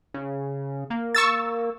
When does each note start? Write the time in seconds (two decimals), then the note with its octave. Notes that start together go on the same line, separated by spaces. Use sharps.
0.14 C#3
0.90 A#3
1.15 C#6 E6 A6